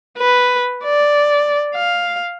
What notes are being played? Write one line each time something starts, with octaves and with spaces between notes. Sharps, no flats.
B4
D5
F5